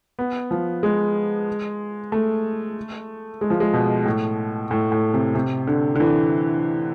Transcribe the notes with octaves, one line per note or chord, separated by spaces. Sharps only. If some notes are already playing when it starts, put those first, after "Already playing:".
B3
F3
G#3
A3
G#3
F3
G#3
B2
A2
A2
A2
C3
C3
D3
D3
E3